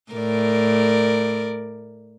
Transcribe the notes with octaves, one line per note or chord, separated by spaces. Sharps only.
A2 A#4 D5